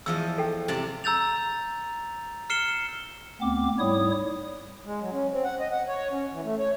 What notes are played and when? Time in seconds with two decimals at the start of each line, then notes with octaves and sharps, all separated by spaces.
0.06 E2 F3 D#5 E6
0.38 A4 G5
0.68 C3 D5 A5
1.04 A#5 E6 G6 A6 F7
2.50 F6 C7 C#7 E7 G7
3.41 D2 B3 C4 D6
3.79 G#2 G3 E4 C#5 D#6
4.85 G#3
5.01 F#3
5.12 C#4
5.32 C4
5.44 F#5
5.60 D#5
5.71 F#5
5.88 C#5
6.11 C#4
6.32 E3
6.44 A3
6.59 C#5